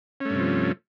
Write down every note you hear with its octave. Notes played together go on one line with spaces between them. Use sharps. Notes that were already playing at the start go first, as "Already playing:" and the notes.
G2 C3 F3 A3 C#4